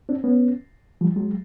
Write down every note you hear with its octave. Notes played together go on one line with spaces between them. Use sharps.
C4 D4
B3 C#4
F3 G3
F#3 G#3